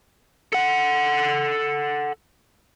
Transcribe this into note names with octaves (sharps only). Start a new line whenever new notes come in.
A4 F#5